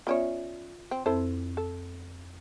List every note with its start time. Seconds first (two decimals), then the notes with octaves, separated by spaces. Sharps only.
0.07 B3 C#4 F4 C#5 D5 E5
0.91 C4
1.06 F2 C4 E4 A4 C5
1.57 A4